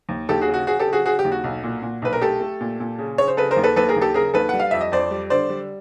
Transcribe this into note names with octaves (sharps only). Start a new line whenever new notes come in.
D#2
D#2 G4 A4
F#4 G#4
C#3
F#4
C#3 F#4 G#4
G4 A4
C#3
F#4 G#4
C#3 F#4 G#4
G4
D#2
F#4
B1
A#2
A#2
B1 B4
A#4
A3 G4 A4
A3
A#2
A#2
C#3
C#3 C#5
C5
C#3 A4 B4
A#4 C5
D#2
A4 B4
D#2 A4 B4
G#4 A#4
D#2
G4 A4
C#3 G#4 A#4
D#2 A4 B4
G3 F#5
F5
F2 E5
D#5
F2 C5 D5
G3
D3 C5 D5
G3